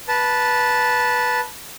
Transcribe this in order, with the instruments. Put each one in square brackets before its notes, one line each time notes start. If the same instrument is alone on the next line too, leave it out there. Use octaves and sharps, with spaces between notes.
[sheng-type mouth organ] B4 A5